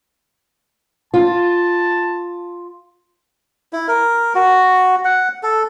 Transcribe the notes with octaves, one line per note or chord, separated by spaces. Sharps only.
F4 A5
E4
A#4
F#4
F#5
A4